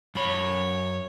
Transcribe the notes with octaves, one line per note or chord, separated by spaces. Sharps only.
F#2 C#5 B5